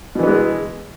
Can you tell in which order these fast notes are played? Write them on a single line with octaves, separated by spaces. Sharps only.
B2 E3 B3 G#3